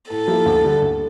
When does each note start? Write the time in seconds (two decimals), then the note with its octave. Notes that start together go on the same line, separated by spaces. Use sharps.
0.10 A2 A4
0.28 F3 A#3 E4 G4
0.46 D2
0.64 D3 G3
0.82 D2